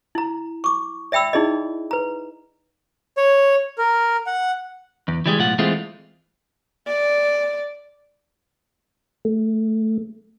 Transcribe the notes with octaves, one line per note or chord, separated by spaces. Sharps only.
E4 A#5
C#6 D6
D5 E5 G5 B5 E6
D#4 E4 G#4 D5 D#5
B4 A#5
C#5
A#4
F#5
E2
E3 G3 G#3
B1 A2 F4 F#5
E3 G#3 A3 C4 F4
D5
A3